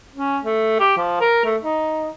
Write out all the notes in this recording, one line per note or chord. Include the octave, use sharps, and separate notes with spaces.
C#4
A3
G4
F3
A#4
A3
D#4